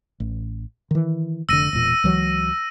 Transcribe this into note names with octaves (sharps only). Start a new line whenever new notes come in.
A1
D#3 E3
F1 D3 E6 A#6 D#7
E1 A#2
C#2 E3 F#3